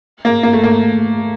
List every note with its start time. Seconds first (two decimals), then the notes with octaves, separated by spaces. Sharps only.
0.25 A#3
0.43 A#3
0.53 A3
0.64 A#3